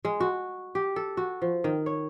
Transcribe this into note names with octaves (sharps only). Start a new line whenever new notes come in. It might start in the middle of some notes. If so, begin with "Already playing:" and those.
G#3
F#4
G4
A4
F#4
F3
D#3
C#5